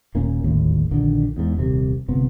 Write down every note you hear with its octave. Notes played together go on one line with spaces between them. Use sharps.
D#1 A#2 A#3 C#4
D1 G#1 D#2 A2
A#1 D3 D#3
E2 G#2
D#1 C2 C3
G1 C3 B3